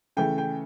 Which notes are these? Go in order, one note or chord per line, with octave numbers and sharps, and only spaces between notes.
C#3 E3 A3 G5
G5